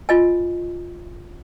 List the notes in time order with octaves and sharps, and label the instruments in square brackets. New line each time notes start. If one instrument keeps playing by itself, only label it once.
[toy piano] F4 D#5 G#5